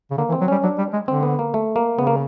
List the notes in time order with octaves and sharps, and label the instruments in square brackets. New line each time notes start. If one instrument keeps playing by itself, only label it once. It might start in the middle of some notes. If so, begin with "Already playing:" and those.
[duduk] C#3
[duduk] D3 [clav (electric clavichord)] A#3
[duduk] E3
[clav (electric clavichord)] C4
[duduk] F#3
[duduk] G3 [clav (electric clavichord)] C#4
[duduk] F#3 [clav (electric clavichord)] D4
[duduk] G3
G#3
[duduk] D3 [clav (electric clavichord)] C4
[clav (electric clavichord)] B3
A#3
A3
A#3
[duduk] C#3 [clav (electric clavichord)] B3
[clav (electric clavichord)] A#3